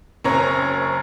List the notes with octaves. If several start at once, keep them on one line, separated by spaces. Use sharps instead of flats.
F#1 F#2 C4 C#5 A#5